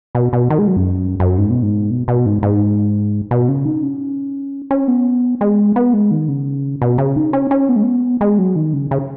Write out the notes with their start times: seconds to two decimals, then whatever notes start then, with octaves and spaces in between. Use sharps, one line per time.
0.15 B2
0.33 B2
0.50 D#3
0.59 G#3
0.67 F#3
0.76 F#2
1.20 F#2
1.38 G#2
1.50 B2
1.62 G#2
1.91 B2
2.08 B2
2.26 G#2
2.43 G#2
3.31 B2
3.48 C#3
3.66 D#4
3.83 C#4
4.71 C#4
4.88 B3
5.41 G#3
5.76 B3
5.93 G#3
6.11 D#3
6.28 C#3
6.82 B2
6.98 C#3
7.16 D#4
7.33 C#4
7.51 C#4
7.69 B3
7.76 G#3
7.83 B3
8.21 G#3
8.39 F#3
8.56 D#3
8.73 C#3
8.91 C#3